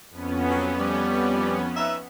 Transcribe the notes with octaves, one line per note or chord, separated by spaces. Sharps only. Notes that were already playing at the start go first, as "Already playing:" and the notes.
F2 B3 C#4
F#3
G3
D#4 B4 E5